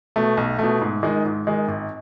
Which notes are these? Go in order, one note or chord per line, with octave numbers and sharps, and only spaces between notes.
B2 A3
B1
B2 A3
G#2
D#3 G#3 D#4
G#2
D#3 G#3 D#4
G#1